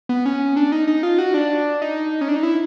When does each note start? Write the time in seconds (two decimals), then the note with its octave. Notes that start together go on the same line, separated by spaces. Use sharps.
0.09 B3
0.26 C#4
0.56 D4
0.72 D#4
0.87 D#4
1.03 F4
1.18 F#4
1.34 D4
1.82 D#4
2.21 C#4
2.29 D4
2.36 D#4
2.43 E4